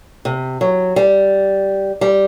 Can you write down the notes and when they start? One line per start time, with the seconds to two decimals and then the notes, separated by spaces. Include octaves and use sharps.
0.25 C3
0.61 F#3
0.96 G3
2.01 G3